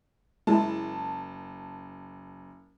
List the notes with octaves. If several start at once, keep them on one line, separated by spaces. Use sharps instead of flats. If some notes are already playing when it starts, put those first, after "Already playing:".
F#1 G#3 E4 A5